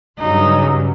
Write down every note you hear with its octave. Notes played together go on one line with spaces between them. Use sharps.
G2 C#3 F#3 D#4